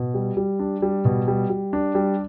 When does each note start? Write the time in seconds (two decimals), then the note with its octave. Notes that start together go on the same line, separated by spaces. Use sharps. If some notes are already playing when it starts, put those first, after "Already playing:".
Already playing: B2
0.14 G3
0.37 G3
0.59 D4
0.82 G3
1.05 B2
1.28 G3
1.50 G3
1.73 D4
1.95 G3